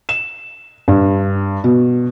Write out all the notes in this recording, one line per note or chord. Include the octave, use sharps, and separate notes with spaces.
E7
G2
B2